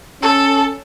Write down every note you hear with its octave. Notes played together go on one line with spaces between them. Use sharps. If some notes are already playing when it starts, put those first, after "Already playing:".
C#4 A4